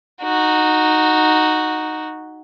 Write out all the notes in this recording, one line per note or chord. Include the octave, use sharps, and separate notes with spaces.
D#4 F#4